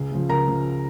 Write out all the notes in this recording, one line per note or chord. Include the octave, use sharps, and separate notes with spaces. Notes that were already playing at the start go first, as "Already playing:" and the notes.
Already playing: C#2 G#4
C#3 F3
C#2 A#4 A#5
C#3 F3